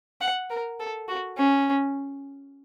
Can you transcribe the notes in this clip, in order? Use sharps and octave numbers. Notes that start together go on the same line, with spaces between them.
F#5
A#4
A4
F#4
C#4